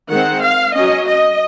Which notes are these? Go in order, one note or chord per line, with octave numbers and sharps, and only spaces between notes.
D#3 G#3 C4 F#5
F5
F#3 C#4 D#5
D#5